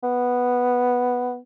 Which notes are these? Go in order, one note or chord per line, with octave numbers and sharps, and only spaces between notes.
B3